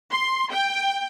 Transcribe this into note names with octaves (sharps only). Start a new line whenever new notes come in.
C6
G5